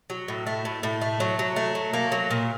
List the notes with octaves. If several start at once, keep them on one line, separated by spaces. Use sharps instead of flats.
F#3
A2
A3
A2
A2
A3
F#3
F#3
A3
F#3
A#3
F#3
A#2